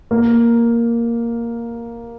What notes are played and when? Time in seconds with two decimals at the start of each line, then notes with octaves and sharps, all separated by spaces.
0.11 A#3